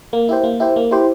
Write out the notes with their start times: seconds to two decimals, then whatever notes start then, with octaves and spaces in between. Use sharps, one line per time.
0.13 A#3
0.29 E4 G4 C5
0.44 A#3
0.60 E4 G4 C5
0.76 A#3
0.91 E4 G4 C5